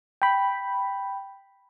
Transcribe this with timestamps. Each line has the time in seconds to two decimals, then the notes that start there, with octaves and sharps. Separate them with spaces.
0.22 G5 B5